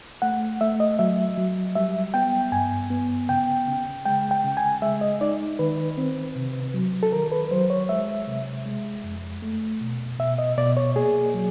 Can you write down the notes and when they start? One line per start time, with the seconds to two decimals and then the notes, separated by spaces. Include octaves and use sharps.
0.22 A3 F#5
0.61 A3 E5
0.80 D#5
0.99 F#3 E5
1.37 F#3
1.75 G3 E5
2.14 B3 G5
2.52 G2 G#5
2.91 B3
3.29 C#3 G5
3.67 C#3
4.05 G#3 G5
4.31 G5
4.44 C#3
4.57 G#5
4.82 G#3 E5
5.01 D#5
5.21 D#4 D5
5.59 D#3 B4
5.98 C4
6.36 C3
6.74 F#3
7.03 A4
7.12 D#3 A#4
7.32 B4
7.51 F#3 C5
7.70 C#5
7.89 G#3 E5
8.28 C3
8.66 G#3
9.04 F2
9.42 A3
9.81 B2
10.19 B2 E5
10.38 D#5
10.58 B2 D5
10.77 C#5
10.96 A#3 G#4
11.34 F#3